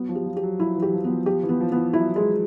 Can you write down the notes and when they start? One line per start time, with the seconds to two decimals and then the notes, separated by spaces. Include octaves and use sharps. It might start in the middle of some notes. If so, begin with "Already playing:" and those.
Already playing: F#3 B3
0.09 F3
0.15 G4
0.26 F3
0.36 G4
0.43 F#3
0.59 F3 E4
0.76 E3
0.82 G4
0.93 F3
1.04 B3
1.09 F3
1.26 F3 G4
1.43 E3
1.49 B3
1.61 F3
1.72 B3
1.77 E3
1.93 F#3 E4
2.16 G#3